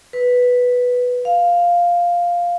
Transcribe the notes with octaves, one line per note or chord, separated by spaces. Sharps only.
B4
F5